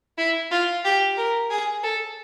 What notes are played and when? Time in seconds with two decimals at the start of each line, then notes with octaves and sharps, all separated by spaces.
0.18 E4
0.51 F4
0.85 G4
1.17 A#4
1.50 G#4
1.83 A4